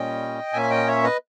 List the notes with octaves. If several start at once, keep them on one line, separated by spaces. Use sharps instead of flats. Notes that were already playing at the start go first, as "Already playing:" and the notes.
Already playing: A#2 G3 C#4 D#5 G5
A#2 A#3 C#4 E5 G#5
D#5 G5
C#5 E5
B4 D#5